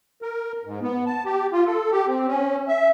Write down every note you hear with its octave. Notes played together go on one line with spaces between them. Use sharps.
A#4
G#2
B3
A5
G4
F4
A4
G4
C4
C#4
E5